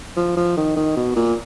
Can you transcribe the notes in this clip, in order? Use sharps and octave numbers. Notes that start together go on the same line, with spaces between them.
F3
F3
D#3
D#3
B2
A#2